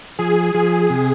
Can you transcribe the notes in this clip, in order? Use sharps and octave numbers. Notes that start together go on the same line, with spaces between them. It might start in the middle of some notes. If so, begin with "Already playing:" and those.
F3 G#4
F3 G#4
C3